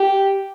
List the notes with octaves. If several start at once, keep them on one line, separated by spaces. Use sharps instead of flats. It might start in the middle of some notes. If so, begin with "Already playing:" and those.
Already playing: G4